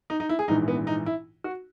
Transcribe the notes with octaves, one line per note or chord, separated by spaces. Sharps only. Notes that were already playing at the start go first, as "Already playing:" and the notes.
D#4
D#4
E4
G#4
A#1 G#2 E3 D#4
B3
D#4
E4
F#4